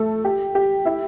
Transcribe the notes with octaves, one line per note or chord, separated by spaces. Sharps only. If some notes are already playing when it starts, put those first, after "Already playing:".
Already playing: A3 A4
G4
G4
E4